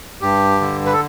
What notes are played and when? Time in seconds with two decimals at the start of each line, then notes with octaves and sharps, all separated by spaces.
0.21 G2 G4
0.61 D3
0.86 B4
0.93 A4